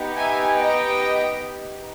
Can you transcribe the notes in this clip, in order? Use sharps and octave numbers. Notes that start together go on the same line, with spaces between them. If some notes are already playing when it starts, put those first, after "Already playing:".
Already playing: B3 D#4 G4
E5 G#5
D#5 G5